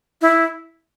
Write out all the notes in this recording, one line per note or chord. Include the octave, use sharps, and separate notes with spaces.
E4